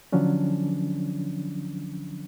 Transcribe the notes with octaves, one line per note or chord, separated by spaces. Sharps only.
D3 F3 F#3 C#4 D4